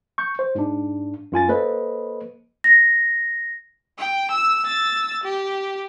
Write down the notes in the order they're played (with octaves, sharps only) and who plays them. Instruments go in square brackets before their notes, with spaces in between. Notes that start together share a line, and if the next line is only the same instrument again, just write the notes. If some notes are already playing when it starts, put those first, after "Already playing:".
[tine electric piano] C#6 G6
C5
G#2 D4
F#2 F4 G#5 A6
A#3 A4 B4 C5 D#5
[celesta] A#6
[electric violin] G5
E6
E6 A6
G4